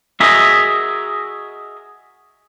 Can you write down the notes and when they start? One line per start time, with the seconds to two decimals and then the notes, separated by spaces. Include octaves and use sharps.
0.20 F#4 G#4 A#4 D#5 E5